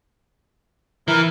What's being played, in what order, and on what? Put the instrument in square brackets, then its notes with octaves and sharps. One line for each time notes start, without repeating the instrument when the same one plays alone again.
[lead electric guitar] E3 [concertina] E4 A#4